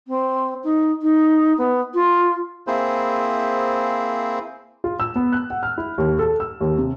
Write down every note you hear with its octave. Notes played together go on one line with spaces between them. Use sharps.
C4
D#4
D#4
B3
F4
A#3 C4 E4 G#4 C5
F4
E6
B3
F#6
F#5
F6
E4
D#2
A4
E6
D#2
C3